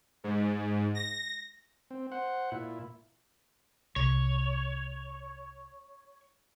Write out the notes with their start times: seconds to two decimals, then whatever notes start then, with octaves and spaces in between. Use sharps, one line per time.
0.24 G#2
0.95 A#6
1.91 C4
2.12 C5 F#5
2.52 A#2 E4
3.96 C2 C#5